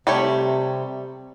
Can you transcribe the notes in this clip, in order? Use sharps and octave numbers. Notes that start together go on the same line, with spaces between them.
C3 G3 A3 C#5